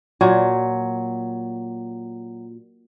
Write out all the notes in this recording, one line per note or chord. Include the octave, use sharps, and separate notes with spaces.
A#2 F#3